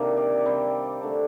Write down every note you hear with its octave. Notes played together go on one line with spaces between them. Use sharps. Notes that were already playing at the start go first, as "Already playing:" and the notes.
Already playing: C3 D#3 A#3 D4
D5
C3 G3 C4 C5
D3 A3 D4